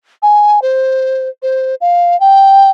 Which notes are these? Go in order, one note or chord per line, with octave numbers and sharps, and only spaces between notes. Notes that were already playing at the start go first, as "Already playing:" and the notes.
G#5
C5
C5
F5
G5